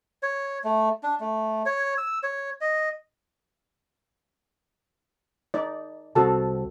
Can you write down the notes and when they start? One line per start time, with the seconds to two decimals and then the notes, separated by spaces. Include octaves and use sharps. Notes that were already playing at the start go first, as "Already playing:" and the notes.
0.23 C#5
0.64 A3
1.03 D4
1.20 A3
1.66 C#5
1.98 E6
2.23 C#5
2.61 D#5
5.54 D#4 D5
6.15 C2 C4 F#4 A4 A5